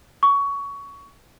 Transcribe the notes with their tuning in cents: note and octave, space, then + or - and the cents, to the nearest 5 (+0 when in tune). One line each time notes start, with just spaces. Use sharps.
C#6 +20